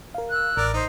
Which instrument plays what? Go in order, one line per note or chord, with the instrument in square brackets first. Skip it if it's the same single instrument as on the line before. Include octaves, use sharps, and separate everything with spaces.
[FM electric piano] A#4 F5
[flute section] E6 F#6
[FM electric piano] A1 [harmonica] A#4 D5
[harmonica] D#4 [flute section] C5